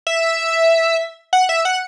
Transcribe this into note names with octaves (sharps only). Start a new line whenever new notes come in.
E5
F#5
E5
F#5